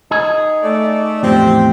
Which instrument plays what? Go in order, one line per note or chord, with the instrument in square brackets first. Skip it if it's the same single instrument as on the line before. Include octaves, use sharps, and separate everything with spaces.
[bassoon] D#4 [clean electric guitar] G#4
[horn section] A3 D5
[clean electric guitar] E2 A2 F3 [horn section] C4 G4